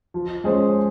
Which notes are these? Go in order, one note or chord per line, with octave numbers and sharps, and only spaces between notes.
F3
G#3 C#4 G#4 C5